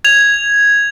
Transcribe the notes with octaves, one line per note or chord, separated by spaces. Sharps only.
G#6 F7